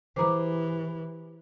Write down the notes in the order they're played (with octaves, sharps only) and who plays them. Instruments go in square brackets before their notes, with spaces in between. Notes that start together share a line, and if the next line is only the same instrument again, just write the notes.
[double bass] E3 [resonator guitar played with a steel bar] G4 G#4 [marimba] C5 A#5 D6